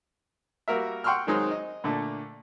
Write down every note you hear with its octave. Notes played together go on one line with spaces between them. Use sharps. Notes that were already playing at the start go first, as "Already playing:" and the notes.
G3 A#3 F#4 A#4 E5
F#5 G5 C6 C#6 E6 F6
D#3 F#3 G#3 C4 D#4
D#5
A#2 D3 A3